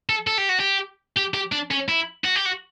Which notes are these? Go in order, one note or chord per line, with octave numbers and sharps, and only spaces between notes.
A4
A4
G4
F#4
G4
G4
G4
D4
C#4
E4
F#4
G4
F#4